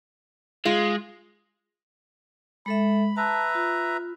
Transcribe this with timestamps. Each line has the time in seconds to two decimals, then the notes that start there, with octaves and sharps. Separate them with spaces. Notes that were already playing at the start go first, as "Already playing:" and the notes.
0.66 G#3 F4
2.66 G#3 A4 E5 B5
3.17 B4 E5 A5 A#5
3.55 F4